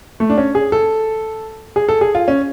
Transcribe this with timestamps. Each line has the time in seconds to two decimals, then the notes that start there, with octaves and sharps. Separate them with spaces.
0.20 A3
0.30 D4
0.38 C#4
0.55 G#4
0.72 A4
1.76 G#4
1.89 A4
2.01 G#4
2.15 F4
2.28 C#4